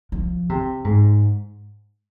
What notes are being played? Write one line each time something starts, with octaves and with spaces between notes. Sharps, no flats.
F3
C3
G#2